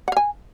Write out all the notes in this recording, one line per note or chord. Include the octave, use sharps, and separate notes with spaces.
F5 F#5 G#5